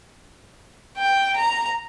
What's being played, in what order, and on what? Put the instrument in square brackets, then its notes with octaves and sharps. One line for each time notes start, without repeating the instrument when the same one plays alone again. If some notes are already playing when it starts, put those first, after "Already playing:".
[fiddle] G5
A#5